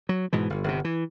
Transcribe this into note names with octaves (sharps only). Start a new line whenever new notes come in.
F#3
G#2 B2 E3
G1
G1 C3
E3